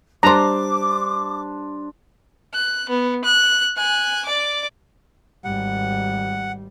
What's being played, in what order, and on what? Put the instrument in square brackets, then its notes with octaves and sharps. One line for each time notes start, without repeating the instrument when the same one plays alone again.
[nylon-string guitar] G3 C5 [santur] D4 C6 [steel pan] A#5 [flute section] D6
[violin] F#6
B3
F#6
G#5 F#6
D5 D6
[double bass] G#1 G3 [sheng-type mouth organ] F#5